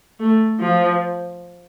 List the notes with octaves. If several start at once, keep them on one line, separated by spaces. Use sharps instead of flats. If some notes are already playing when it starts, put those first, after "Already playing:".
A3
F3